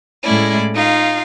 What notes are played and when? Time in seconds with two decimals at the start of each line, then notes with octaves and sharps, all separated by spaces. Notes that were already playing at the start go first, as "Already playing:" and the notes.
0.22 A2 G#3 A3 C#4 E4 D5
0.74 D#4 F4 F5